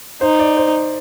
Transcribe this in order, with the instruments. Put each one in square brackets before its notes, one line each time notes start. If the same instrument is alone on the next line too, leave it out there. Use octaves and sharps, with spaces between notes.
[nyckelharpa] D#4 [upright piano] C5
[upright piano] D5
C5